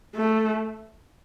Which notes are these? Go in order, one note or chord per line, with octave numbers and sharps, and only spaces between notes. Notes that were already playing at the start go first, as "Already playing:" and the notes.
A3